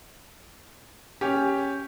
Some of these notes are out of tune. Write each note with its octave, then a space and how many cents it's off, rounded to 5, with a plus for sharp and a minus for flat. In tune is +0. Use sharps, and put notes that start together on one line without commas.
C#4 +0 G4 +0